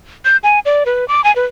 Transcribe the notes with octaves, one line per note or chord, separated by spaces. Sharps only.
G6
G#5
D5
B4
D6
G#5
B4